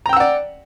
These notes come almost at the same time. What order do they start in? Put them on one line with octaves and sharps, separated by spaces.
A#5 G5 E6 F#5 D5